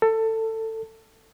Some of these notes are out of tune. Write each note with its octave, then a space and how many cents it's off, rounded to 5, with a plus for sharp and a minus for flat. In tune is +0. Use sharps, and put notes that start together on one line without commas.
A4 +20